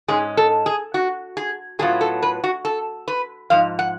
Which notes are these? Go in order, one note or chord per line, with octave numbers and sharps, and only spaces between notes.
G#2 G#3 C#4 G#4
A4
G#4
F#4
G#4
A2 F#3 B3 F4 G#4
A4
B4
F#4
A4
B4
G#2 F3 F5
F#5